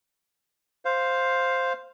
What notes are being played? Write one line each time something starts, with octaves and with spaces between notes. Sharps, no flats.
C5 F5